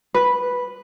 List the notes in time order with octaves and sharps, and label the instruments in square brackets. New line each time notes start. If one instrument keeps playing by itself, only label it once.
[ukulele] B4